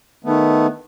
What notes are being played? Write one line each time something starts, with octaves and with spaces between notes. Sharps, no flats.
D#3 A3 B3